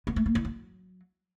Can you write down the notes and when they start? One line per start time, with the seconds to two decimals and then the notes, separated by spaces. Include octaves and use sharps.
0.07 B3
0.16 A3
0.26 A#3
0.35 E4
0.45 F#3